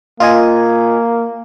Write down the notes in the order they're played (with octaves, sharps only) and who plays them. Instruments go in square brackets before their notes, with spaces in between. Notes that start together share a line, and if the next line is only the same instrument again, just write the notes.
[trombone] A#3 [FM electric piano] F4 D#5 G#5